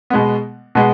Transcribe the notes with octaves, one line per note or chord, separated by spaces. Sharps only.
B2 G#3 B3
B2 G#3 B3